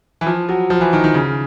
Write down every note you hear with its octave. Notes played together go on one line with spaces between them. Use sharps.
E3
F3
F#3
F3
E3
D#3
D#3
C#3